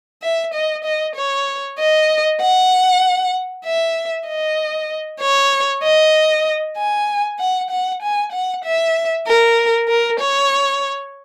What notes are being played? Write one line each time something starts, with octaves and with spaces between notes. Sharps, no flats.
E5
D#5
D#5
C#5
D#5
F#5
E5
D#5
C#5
D#5
G#5
F#5
F#5
G#5
F#5
E5
A#4
A#4
C#5